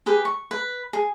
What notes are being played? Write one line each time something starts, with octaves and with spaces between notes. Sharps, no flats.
G4 G#4 B4
C#6
B4
G#4